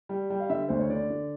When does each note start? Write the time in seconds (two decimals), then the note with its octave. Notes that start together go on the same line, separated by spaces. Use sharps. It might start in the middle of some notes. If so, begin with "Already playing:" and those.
0.09 G3
0.30 G3
0.40 F5
0.50 D3 E5
0.69 D2 C5
0.79 C#5
0.90 D3 D5
1.10 D3